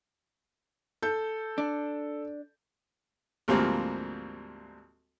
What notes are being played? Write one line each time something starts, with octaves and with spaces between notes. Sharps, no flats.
A4 G6
D4
D2 G#2 F3 G3 A#3 C4